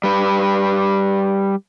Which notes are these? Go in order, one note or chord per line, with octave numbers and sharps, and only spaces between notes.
G3 B4